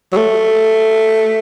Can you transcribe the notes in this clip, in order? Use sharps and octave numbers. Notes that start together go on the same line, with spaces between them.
F#3
A3